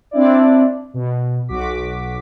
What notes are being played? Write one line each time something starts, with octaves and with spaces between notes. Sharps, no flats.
C4 D4 E4 D5
B2
B1 F#4 D6 B6